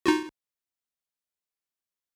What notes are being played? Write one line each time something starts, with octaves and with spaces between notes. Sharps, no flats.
D#4 F4 F#4